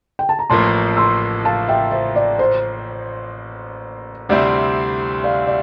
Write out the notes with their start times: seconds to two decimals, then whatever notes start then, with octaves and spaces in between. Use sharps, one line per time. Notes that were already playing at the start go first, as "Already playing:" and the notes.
0.19 G5
0.29 A5
0.39 A#5
0.50 A1 A2 F3 A#3 A5 C6
0.97 C6 E6
1.45 F5 A5
1.68 E5 G5
1.92 C5 E5
2.16 D5
2.39 C5
4.29 D2 C3 G3 C4 E4 D5
5.24 D5 F5
5.47 D5